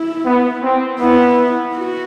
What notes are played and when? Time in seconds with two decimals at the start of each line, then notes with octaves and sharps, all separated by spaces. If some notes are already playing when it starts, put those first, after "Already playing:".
Already playing: E4
0.25 B3
0.63 C4
0.99 B3 E4
1.74 F#4